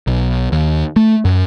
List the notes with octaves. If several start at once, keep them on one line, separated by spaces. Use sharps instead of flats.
B1
D#2
A3
F#2